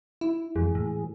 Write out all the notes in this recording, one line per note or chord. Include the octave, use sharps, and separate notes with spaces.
E4
F2 E3 G#3 G#4
A2